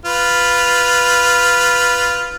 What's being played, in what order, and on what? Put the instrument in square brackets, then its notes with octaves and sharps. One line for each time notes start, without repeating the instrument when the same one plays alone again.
[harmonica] F4 B4